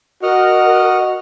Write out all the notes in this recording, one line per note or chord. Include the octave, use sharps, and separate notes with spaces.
F#4 A#4 D#5 F#5 F6